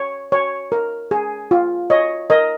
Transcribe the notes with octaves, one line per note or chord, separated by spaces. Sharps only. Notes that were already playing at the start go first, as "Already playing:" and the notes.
Already playing: C#5
C#5
A#4
G#4
F4
C#5 D#5
A#4 D#5